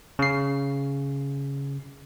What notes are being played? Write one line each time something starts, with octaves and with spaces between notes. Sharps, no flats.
C#3 C7